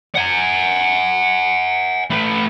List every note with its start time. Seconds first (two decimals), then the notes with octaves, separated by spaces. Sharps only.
0.15 F#5 G#5
2.10 A3 B4